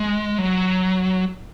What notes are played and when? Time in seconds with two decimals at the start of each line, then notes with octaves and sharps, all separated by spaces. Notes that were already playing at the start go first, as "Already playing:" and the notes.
Already playing: G#3
0.38 F#3